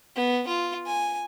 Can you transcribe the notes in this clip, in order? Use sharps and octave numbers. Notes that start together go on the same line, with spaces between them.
B3
F4
G#5